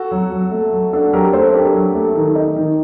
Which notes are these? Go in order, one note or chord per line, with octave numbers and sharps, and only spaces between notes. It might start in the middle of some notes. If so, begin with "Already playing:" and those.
Already playing: F#4 A4
F#3
F#3
A3
F#3
D4 F#4 A4
F#3 G4 A#4
A3 A4 C5
D4 G4 A#4
F#3
A3
D#3
D#4
D#3